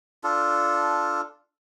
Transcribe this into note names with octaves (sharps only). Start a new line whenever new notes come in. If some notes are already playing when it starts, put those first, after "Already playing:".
D4 F4 A4